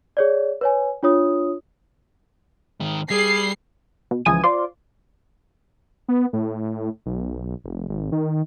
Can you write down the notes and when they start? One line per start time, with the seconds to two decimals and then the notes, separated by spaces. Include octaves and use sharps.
0.17 G#4 C#5 D5
0.61 B4 C#5 G#5
1.03 D4 F4 C#5 D#6
2.80 G#2 D#3
3.10 G3 G#4 C7
4.11 B2
4.25 C#2 E3 F3 G#5 D#6 D#7
4.43 F4 C5 D5 C6 D6
6.08 B3
6.33 A2
7.06 B1
7.64 F1
7.89 G#1
8.12 D#3